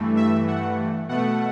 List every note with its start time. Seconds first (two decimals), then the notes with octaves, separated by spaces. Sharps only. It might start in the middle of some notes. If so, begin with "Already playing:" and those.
Already playing: G2 E3 A3
0.17 E5
0.48 F#5
1.09 B2 A3 F#5